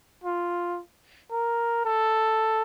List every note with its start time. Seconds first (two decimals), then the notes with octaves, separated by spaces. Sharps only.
0.24 F4
1.31 A#4
1.85 A4